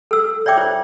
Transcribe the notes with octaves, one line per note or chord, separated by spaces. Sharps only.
A4 E6
C#5 D5 E5 G5 D6
F4 C5